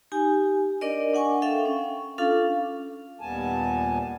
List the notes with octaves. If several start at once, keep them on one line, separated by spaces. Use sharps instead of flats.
D#4 G4 G#5
D4 A#4 D5 D#5
D4 F#5 G#5 C#6
A4 E5 F5 G5
C#4
C#4 D4 F4 A4 F5
D#2 A#2 G3 B3 G#5 A5